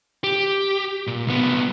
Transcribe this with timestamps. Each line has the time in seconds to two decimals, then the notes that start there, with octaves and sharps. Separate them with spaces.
0.24 G4
1.07 A#2
1.27 C2 B3